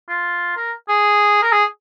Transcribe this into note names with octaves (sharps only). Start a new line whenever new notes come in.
F4
A#4
G#4
A#4
G#4